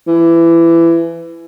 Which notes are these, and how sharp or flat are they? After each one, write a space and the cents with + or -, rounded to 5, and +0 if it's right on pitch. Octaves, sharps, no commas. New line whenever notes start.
E3 +20